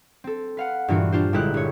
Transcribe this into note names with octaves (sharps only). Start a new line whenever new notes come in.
C4 A4
B4 F5 F#5
G2 A#2 E3 D4 F4 F#4
D4 F4 G4 C5
G1 A#2 G#3 E4 G4 F#6
G1 C#5